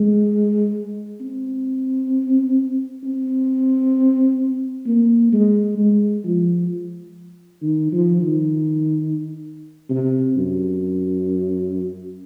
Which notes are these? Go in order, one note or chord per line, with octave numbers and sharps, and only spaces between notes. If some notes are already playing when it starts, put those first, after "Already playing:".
Already playing: G#3
C4
C4
A#3
G#3
G#3
F3
D#3
F3
D#3
C3
F#2